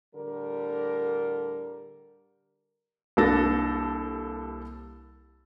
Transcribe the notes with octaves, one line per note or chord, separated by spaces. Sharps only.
A2 D3 G3 A#4
C2 A#3 D4 A4 A6 A#6